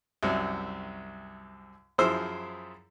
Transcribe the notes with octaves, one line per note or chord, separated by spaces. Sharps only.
C2 F#2 C3
F#2 F3 E4 G#4 C5 E6